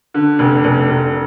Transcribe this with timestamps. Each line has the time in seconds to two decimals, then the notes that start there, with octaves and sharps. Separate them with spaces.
0.14 D3
0.39 F1
0.64 F1
0.90 F1